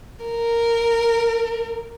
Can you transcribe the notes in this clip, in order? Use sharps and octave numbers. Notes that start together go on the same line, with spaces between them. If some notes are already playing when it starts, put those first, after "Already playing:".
A#4